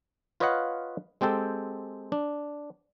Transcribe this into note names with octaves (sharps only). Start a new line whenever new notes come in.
F4 B4 C#5 D#5 F5 F#5
G#3 C4 G4 A4 G5
D4